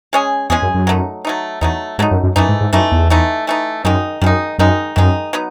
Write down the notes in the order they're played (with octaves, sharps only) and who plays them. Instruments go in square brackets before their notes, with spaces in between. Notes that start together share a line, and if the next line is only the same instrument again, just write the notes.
[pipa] G#3 C#4 G#4
[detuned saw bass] E2 [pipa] G#3 C#4 G#4
[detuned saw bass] F#2
F#2
[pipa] F#3 A3 D#4
F#3 A3 D#4
[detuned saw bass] E2 [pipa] F#3 A3 D#4
[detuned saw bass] G#2 [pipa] F#3 A3 D#4
[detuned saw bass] F#2
F#2
[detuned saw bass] F#2 [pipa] E3 A3 D#4
[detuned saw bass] G#2
G#2
[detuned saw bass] F#2 [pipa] E3 A3 D#4
[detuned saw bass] E2
[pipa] E3 A3 D#4
E3 A3 D#4
[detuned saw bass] F#2 [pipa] D#3 G#3 D#4
[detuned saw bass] F#2 [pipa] D#3 G#3 D#4
[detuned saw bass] F#2 [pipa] D#3 G#3 D#4
[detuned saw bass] F#2 [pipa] D#3 G#3 D#4
[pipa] F#3 B3 D#4